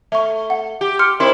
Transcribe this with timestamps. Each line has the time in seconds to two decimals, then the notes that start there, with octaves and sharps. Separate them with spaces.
0.12 A3 E5 C#6
0.50 F#5
0.81 G4
0.99 C6 F6 C#7
1.20 C4 D#4 E4 A#4 C6